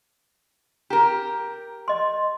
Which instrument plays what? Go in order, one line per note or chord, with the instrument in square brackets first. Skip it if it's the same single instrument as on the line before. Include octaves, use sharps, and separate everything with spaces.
[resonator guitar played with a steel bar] G4 A#4 [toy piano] A#5
[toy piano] D#5 C6